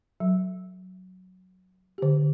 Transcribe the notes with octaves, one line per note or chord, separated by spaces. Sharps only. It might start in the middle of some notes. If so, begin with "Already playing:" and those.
F#3
D3 G4